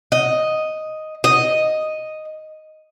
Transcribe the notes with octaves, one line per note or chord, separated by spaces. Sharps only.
D#5
D#5